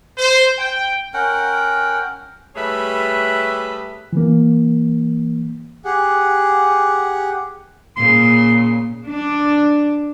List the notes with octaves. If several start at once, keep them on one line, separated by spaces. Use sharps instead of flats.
C5
G5
C#4 A#4 F#5 G5
G3 A3 G#4 B4 C#5 E5
E3 A#3
G4 G#4 F#5
A#2 C#3 C6
D4